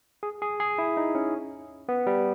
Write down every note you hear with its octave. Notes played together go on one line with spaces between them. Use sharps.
G#4
G#4
G#4
E4
D#4
C#4
B3
G3